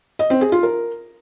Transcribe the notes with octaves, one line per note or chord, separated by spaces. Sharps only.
D#5
C4
G#4
F4
A#4